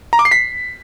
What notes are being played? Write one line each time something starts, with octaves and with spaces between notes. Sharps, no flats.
A#5
D6
C7
B6